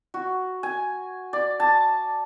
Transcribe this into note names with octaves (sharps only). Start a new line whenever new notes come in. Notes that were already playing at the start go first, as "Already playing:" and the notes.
F#4
G#5
D5
A5